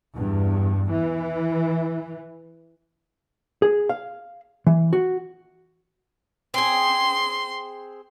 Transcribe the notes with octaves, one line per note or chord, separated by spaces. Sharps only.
E2 G2
E3
G#4
F5
E3
F#4
C4 G#4 C6